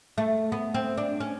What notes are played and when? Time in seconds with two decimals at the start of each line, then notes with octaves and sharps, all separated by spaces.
0.18 A3
0.52 B3
0.74 C4
0.97 D4
1.20 C#4